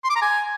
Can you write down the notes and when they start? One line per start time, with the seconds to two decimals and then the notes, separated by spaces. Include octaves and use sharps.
0.04 C6
0.10 D6
0.16 A#5
0.22 G#5